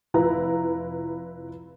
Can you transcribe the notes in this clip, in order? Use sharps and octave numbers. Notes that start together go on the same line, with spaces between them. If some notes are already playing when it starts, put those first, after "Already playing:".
F1 E4 F4 B4 A#5